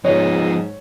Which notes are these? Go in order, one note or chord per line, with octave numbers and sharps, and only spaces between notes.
G#2 F3 B3 C#5 D#5